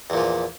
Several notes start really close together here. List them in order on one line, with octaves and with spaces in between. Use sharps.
E2 A#2 F3